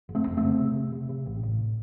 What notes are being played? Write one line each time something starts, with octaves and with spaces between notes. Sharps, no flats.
F#1
A3 C4
F2
A3 C4
C#3
C3
C3
C3
C3
A1
A2